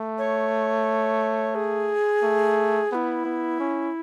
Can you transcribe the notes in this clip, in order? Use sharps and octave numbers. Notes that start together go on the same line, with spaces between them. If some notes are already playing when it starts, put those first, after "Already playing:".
Already playing: A3
C#5
G#4
A3
B3 E4 G#4
B3
C#4